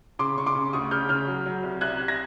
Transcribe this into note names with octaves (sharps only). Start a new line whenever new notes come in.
C#3 C6 D6
C#3 C#6
C6 D6
C#3
D2 C#6 D#6
C#3 F6 G6
C#3 F6 G6
F#3
F#3
C2
C2 F#6 G#6
C3
G#6 A#6